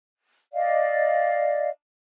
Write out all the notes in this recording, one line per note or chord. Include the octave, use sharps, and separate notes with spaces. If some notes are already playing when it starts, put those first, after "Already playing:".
D5 D#5 F5